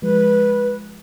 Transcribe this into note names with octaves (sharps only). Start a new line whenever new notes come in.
F3 G#3 B4